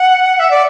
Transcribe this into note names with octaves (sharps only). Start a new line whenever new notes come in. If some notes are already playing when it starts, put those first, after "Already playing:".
Already playing: F#5
E5
D5